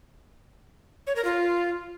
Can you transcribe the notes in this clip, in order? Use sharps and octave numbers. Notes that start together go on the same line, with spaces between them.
C#5
A#4
F4